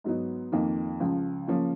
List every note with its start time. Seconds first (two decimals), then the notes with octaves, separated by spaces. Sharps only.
0.04 G#2 F#3 B3 D#4
0.52 F2 D#3 A#3 D#4
1.00 C#2 C#3 F3
1.47 C#3 F3 A#3 C#4